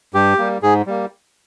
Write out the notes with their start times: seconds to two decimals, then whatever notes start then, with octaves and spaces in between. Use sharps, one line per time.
0.14 G2 G4
0.38 G3 A#3
0.63 G#2 G#4
0.87 G3 A#3